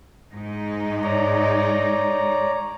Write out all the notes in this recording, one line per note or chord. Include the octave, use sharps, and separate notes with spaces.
G#2 D#4
C#5 D5 A#5